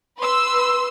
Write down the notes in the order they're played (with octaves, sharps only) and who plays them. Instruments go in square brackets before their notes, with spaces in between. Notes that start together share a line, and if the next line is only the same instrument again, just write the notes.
[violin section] B4 C6 E6